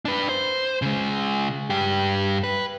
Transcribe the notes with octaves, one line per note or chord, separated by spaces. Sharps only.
D4 B4
C5
C#3 G#3
G2 G4
B4